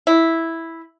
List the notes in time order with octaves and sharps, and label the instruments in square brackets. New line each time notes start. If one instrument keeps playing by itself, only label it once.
[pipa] E4